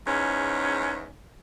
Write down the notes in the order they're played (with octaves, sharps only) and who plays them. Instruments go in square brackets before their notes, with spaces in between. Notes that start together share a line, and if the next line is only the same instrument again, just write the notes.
[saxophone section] E2 G#2 C#4